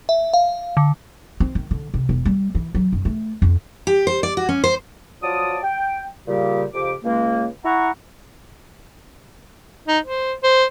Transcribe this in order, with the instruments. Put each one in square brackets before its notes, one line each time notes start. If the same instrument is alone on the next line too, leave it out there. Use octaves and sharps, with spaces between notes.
[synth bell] E5
F5
D3
[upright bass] C4
D#3
D3
C3
E1
G3
E3
F#3
F#2
A3
F2
[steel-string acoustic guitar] G4
C5
D5
F#4
C#4
C5
[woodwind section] F3 F#3 F4 D5 A5 D#6
G5
A#2 C#3 G3 G4
F2 C#3 G4 D6
C#2 G#3 A#3
E4 F#5 A#5 C#6
[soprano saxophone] D#4
C5
C5